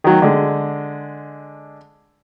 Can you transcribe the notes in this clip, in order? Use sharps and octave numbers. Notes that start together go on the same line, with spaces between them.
D#3 F#3
D3 G#3